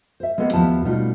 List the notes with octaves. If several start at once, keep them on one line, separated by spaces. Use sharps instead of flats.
C5 E5
G#3 A#3 B3 A4
D#2 F3 B3 E4 C5 A5
B2 G3 A3 D#4 F4